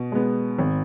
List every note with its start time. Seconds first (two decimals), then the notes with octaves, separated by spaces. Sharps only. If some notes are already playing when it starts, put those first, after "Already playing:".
Already playing: B2
0.12 G#3 B3
0.59 G#1